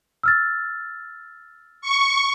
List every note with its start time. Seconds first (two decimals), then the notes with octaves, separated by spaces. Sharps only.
0.23 E6 F6 A6
1.81 C#6